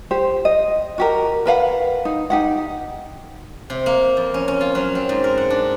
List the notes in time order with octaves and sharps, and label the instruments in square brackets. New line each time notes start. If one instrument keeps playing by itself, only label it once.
[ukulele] G4 C5
D#5
F#4 G4 A#4
A#4 B4 F5 F#5
D#4
D#4 G4 F#5
[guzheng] C3
A#3
F2
C#4
C#4
F4
F#3
C4
G#2
A#4
F#5
D4